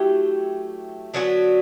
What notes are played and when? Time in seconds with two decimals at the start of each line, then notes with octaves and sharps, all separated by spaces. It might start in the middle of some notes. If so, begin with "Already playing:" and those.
Already playing: F#3 A3 E4 G4
1.14 D3 F#3 B3 F#4